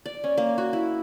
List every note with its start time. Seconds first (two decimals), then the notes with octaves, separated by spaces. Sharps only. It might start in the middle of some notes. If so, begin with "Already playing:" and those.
0.06 D5
0.24 C#4
0.38 A#3
0.58 F#4
0.73 E4